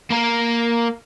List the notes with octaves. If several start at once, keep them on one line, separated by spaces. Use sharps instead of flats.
A#3 A#4